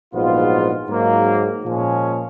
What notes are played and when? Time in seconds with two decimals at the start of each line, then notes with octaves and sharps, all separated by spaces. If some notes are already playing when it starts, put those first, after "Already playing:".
0.14 A#1 G#2 F#3 B3 F4
0.88 G#2 F#3 A#3
1.63 A#2 F3 G#3 C#4